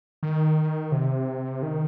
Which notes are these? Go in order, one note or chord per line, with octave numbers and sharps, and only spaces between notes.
D#3
C3
D#3